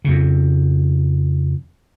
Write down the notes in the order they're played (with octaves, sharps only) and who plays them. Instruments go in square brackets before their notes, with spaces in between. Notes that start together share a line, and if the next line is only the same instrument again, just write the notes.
[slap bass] F2 C#3